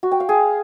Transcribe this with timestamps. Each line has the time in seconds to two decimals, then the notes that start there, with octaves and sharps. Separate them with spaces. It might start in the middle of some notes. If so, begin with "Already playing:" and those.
0.03 F#4
0.12 G5
0.20 F5
0.29 G#4